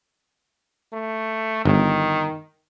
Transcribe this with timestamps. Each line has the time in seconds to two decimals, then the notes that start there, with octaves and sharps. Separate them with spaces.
0.93 A3
1.65 G1 D#3